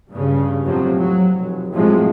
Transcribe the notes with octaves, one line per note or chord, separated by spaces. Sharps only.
G2 C#3
F2 A2 C3 F3 F#3
F#3
F1
F2 A2 C3 F3 F#3 G#3